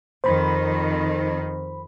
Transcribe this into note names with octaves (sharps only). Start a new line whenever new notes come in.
F2 D#3 C5 B5